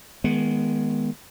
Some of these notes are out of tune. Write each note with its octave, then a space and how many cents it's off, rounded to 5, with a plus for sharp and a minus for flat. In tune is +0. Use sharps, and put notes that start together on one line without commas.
D#3 +20 G#3 +10 B3 -10